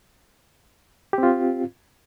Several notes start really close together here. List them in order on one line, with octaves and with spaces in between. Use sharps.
G4 C4 F4